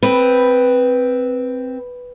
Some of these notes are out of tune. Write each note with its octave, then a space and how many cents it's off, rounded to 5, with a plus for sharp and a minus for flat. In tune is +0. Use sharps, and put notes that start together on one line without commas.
C4 +0 B4 +0